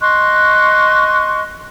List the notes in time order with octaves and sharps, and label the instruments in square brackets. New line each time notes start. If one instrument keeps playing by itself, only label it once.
[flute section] D#5 C6 C#6 F#6